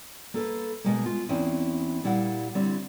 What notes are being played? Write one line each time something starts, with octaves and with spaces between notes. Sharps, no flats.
A#3 A4 B4
B2 G#3 A#3
F4
E2 C4 C#4 E4
A#2 G3 E4 F5 F#5
D3 G3 C4 E4 C#5